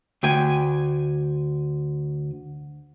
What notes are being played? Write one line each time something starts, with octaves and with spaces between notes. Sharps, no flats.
D2 G5 G#5